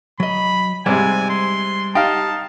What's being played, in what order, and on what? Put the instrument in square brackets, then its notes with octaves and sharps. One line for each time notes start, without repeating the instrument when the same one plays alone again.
[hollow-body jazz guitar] F#3 D#5 [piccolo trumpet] B5
[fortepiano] G#2 C3 [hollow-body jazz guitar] G3 [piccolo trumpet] G#5
[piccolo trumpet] C6
[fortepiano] D#4 F5 [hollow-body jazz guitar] G4 G5 [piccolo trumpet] A5